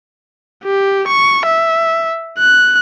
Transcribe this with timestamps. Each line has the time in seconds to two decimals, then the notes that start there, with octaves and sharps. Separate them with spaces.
0.64 G4
1.08 C#6
1.46 E5
2.39 F#6